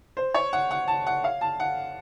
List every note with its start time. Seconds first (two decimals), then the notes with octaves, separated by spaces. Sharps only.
0.17 C5
0.34 C#5
0.53 F#5
0.71 F#5
0.88 A5
1.07 F#5
1.24 F5
1.41 A5
1.60 F#5